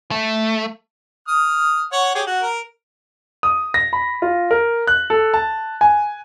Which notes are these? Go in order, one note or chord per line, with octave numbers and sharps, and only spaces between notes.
A3
D#6 F6
C#5 F#5
G4 G#4 C#5
F#4
A#4
D#6
A#6
B5
F4
A#4
F#6
A4
A5
G#5